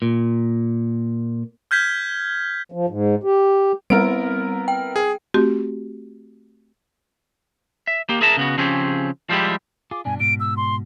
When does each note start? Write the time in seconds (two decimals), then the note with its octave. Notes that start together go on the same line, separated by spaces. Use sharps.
0.02 A#2
1.71 F6 G6 G#6 B6 G7
2.72 F3
2.89 G#2
3.24 G4
3.90 G3 B3 C4 E4 A#4 D7
4.68 G5
4.96 G#4
5.34 A3 C4 F#4 G4
7.87 E5
8.09 A#3 G4
8.21 G#4 A#4 E5 A5 A#5
8.37 C#3 B3 F#4
8.58 C#3 F3 C4 C#4 G4 G#4
9.29 F3 G3 G#3 E4 G4
9.91 F4 G#4 D6
10.05 G2 B2 D4 G#5
10.20 G#2 B2 D7
10.40 E6
10.57 C6